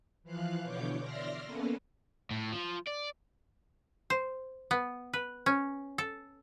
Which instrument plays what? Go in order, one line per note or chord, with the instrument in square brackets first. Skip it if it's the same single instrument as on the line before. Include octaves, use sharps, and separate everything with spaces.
[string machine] E3 F3 F5 F#6
B2 D3 E3 C#5 D6 G6
D5 E5 C6 F6 A#6
A#3 B3 C#4 A4 B4
[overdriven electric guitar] A2
F3
D5
[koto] C5
B3
B4
C#4
A4